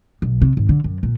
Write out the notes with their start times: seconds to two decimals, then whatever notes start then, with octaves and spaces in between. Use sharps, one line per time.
0.22 B1
0.42 C3
0.57 G#1
0.69 D3
0.84 F#2
1.03 A#2